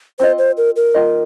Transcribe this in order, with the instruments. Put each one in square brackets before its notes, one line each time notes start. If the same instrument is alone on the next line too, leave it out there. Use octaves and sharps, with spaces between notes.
[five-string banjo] C4 F4 D#5 [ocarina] C5
[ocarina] C5
A#4
A#4
[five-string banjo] D#3 A#3 F4 D#5